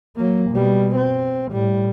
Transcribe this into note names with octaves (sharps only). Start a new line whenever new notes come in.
F#3 A#3
B2 G3
C4
A2 G3